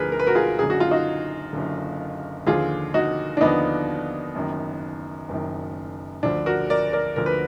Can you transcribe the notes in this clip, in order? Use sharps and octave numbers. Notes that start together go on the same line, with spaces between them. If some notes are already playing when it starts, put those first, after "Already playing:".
Already playing: D2 D3 F3 G#4 A#4 B4
A#4
B4
F#4 A#4
F4 G#4
F#1 F#2 D3 G#4
F#4
F4
D#4 F#4
F#1 F#2 D3
D#2 D3 F3 F4 G#4
D#4 F#4
D4
D#2 D3 F3 B3 D#4
F#1 F#2 D#3
F#1 F#2 D#3
D2 D3 F3 D4
F#4 A#4
A#4 D5
A#4 D5
D2 D3 F3 A#4
B4